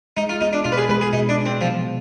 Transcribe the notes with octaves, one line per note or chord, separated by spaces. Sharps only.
G#3 D#4
F4
B3 D#4 F4
D4
B2 F4
B4
G#4
G#3 B3 B4
G#4
B2 D#4
D4
G#3 B3
C4
C3 F3
D#3